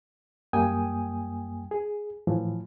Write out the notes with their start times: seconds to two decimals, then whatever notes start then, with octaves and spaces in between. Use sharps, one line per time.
0.53 F#2 G3 A#3 G5 G#5 D#6
1.71 G#4
2.27 A2 E3 F3